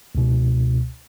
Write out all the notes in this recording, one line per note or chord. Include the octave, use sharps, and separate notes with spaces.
C#2 B2